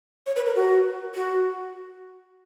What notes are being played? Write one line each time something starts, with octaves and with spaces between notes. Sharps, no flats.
C#5
B4
A#4
F#4
F#4